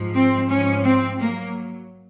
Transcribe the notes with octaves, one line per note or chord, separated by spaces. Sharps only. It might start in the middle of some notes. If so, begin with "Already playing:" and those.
Already playing: G#2 F3
C4
G#2 F3 C#4
C4
F#3 A#3